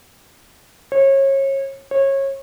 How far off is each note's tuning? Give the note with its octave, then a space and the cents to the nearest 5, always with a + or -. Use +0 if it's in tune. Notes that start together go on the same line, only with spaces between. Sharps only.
C#5 -30
C#5 -25